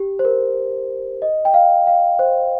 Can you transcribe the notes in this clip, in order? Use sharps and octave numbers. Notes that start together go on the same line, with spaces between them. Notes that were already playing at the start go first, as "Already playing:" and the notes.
Already playing: G4
C5
A#4
D#5
G5
F5
F5
C5